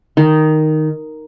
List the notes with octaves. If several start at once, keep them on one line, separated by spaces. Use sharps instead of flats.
D#3